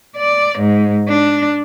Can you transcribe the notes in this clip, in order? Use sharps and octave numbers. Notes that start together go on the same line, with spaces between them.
D5
G#2
D4